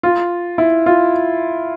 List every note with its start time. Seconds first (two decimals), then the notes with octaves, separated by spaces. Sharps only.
0.03 F4
0.58 E4
0.86 F4